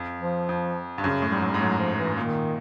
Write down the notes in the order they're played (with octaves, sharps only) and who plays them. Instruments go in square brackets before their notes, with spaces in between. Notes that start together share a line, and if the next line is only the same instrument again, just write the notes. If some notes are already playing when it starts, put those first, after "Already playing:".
Already playing: [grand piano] F2
[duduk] F3
[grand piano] F2
G2
[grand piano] F#2 [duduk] C#3
[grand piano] A2
[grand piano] G#2 [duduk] G3
[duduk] F#3
G3
[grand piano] G#2
[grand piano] A2 [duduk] F#3
[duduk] F3
E3
[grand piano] A#2 [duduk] D#3